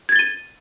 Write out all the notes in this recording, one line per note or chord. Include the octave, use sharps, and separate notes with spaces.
G#6 A6 D#7 G7